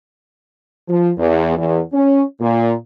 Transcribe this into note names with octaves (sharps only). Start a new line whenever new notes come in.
F3
E2
E2
C#4
A#2